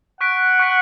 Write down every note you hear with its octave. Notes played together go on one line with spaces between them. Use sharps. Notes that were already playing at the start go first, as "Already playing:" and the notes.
F#5 C#6 F#6 B6 D7
C#6 F#6 B6 D7